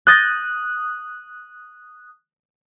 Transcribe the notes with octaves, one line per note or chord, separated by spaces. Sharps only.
D#6 F#6 G6 A6 A#6